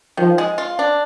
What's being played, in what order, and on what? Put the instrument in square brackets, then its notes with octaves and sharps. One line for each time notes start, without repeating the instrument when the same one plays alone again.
[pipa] D#3 [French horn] F3
[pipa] G#3
F4
D4